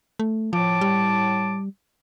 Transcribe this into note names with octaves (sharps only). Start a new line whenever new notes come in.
A3
A2 F3 A5 D6
G3